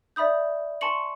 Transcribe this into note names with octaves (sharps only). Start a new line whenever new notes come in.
D5 E5 B5 D#6 G6
G#5 A5 C6 C#6 C#7 F#7